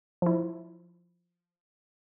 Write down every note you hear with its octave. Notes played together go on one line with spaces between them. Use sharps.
F3 E4